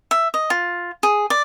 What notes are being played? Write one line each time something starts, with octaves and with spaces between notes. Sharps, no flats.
E5
D#5
F4
G#4
D5